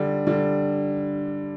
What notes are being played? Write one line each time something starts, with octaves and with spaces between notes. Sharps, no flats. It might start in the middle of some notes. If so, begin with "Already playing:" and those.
Already playing: D3 G3
D3 G3